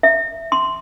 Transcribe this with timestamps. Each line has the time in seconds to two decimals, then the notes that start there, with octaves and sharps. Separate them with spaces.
0.03 E5
0.52 C6